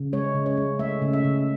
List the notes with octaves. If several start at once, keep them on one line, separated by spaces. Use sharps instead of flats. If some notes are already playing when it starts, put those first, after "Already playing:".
Already playing: C#3
G#3 C#5
C#3
C#5
G#3
A3 E5
C#3
E5
C#3